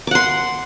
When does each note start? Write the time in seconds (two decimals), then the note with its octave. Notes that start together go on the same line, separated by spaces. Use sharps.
0.07 D6
0.11 F#5
0.15 C6